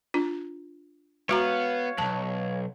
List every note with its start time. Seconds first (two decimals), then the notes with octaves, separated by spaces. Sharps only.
0.14 D4 F4 A#5
1.29 G#3 B3 F#4 C#5 F5 A#5
1.98 B1 F2 A5